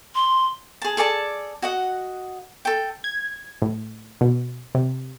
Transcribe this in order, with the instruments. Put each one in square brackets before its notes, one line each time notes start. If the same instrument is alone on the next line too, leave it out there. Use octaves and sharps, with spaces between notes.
[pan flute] C6
[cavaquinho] G#4 A5
G#4 A4 D5 A5
F#4 D#5 F#5
A4 G5
[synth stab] G#6
A2
B2
C3